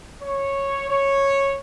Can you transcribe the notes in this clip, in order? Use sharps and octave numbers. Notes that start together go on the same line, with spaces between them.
C#5
C#5